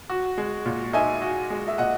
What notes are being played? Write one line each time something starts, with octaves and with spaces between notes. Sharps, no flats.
F#4
G#3
A#2
D#4 E5 G#5
F#4
G#3
E5
A#2 D#5 F#5